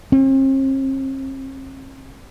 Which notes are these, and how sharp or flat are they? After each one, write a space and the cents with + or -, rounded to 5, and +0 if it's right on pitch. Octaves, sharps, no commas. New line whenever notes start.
C4 +45